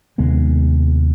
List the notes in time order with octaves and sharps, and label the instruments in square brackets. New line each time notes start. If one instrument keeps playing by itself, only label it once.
[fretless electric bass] D#2 C3 G#3 B3